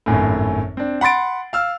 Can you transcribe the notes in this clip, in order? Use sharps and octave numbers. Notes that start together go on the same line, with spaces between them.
G#1 F#2 A2
C4 D4
F#5 B5 C6 A6 D7
F5 E6 F6